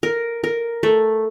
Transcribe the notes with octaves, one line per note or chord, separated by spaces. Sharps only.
A#4
A#4
A3